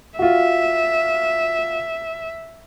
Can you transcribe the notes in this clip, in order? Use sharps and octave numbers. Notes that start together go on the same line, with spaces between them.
F4 F#4 E5